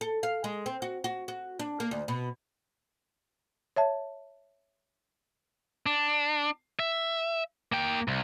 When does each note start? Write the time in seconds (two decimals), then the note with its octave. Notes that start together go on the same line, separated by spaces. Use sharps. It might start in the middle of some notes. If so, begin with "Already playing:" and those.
0.01 A4
0.23 F5
0.44 G#3
0.66 C4
0.82 F#4
1.04 F#4
1.28 F#4
1.59 D4
1.80 A#3
1.91 D2
2.08 B2
3.76 C#5 E5 A5
5.86 D4
6.79 E5
7.72 A#3 G5
8.08 C2